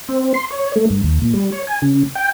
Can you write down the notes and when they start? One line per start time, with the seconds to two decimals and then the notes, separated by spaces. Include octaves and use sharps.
0.09 C4
0.34 C6
0.50 C#5
0.76 A3
0.90 G2
1.03 D#2
1.22 A#2
1.34 G3
1.52 C#5
1.67 G#5
1.82 C#3
2.15 G5